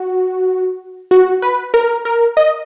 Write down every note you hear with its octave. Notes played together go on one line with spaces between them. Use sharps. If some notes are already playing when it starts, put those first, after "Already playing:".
Already playing: F#4
F#4
B4
A#4
A#4
D#5